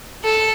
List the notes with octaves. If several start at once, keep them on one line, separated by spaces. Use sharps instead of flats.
A4